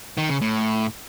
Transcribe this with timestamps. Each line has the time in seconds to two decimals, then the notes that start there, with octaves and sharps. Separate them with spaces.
0.18 D#3
0.29 C#3
0.41 A2